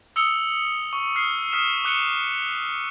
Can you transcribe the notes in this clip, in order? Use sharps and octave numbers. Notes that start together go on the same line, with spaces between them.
D#6 E6 C#7 F7 G7
C#6
D#6 F6 C7
D#6 F6 B6 D#7 E7
D6 F#6 C#7 D#7 E7 G7